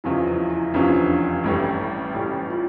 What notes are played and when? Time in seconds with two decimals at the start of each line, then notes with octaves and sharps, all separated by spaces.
0.04 F1 E2 C#3 F3 C#4 E4
0.28 E4
0.50 E4
0.74 F1 E2 C#3 F3 C#4 D4
1.44 A1 A2 G3 C#4
2.14 A1 A2 G3 C#4 E4
2.50 F4